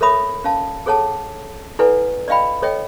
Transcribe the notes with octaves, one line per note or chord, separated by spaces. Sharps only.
A4 A#4 C#5 E5 B5 D#6
C#4 F5 A5
G#4 A4 C#5 F#5 A5
E4 A4 B4 D5 F#5 G#5
D5 D#5 F5 G5 B5
A4 C#5 D#5 G5